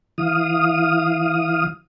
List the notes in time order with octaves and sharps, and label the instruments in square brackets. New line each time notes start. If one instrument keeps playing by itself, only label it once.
[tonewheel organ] E3 F5 D#6